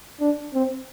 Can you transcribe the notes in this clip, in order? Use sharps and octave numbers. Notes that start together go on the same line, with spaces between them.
D4
C4